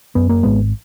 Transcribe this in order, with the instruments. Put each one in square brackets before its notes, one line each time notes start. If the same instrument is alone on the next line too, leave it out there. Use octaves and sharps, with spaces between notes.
[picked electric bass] F#2 B3
A#3
G#1 G#3 B3